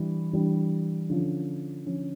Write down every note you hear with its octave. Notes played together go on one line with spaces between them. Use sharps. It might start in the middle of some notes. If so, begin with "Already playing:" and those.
Already playing: E3 G3 D4
E3 G3 D4
D3 F3 C#4
D3 F3 C#4